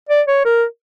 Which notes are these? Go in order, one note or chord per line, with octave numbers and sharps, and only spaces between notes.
D5
C#5
A#4